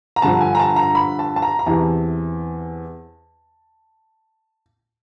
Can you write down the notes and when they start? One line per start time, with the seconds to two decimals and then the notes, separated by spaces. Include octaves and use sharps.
0.16 A#5
0.22 G2 D3 F3 A5
0.41 G#5
0.55 A#5
0.59 A5
0.76 A#5
0.95 B5
1.19 A5
1.36 A5
1.42 A#5
1.59 A#5
1.66 E2 C3 E3 A5